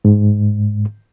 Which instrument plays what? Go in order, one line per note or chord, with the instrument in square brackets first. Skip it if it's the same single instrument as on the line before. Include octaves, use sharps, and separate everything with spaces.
[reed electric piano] G#2